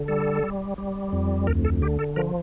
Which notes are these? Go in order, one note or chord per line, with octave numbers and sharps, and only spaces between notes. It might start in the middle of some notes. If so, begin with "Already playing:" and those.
Already playing: D3
G3 A4
G3
G3
F2
D2 A#4
A4
D3 G4
A4
F3 A#4